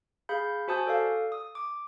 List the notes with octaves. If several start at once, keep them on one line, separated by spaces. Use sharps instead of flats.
G#4 F5 B5 G6
F#4 C5 G#5 A5 D#6 G6
A4 D5 F5
D#6
D6